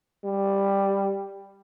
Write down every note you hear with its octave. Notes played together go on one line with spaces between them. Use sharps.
G3